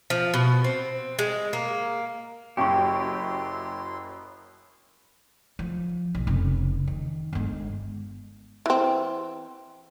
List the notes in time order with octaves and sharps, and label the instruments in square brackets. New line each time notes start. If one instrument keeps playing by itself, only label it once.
[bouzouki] F3
B2
C4
G#3
A#3
[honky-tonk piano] F#1 F#2 [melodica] E4 C6 [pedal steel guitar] G4 [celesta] G5 C#6
[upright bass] F3
B1
F1 C#3
D#3
G1 G#3
[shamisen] E3 C4